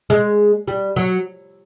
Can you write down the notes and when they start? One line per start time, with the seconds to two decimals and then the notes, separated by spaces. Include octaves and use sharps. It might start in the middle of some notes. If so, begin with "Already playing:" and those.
0.10 G#3
0.68 G3
0.96 F#3